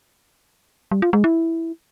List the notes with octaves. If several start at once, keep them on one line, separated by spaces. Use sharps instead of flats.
G3
F4
G#3
E4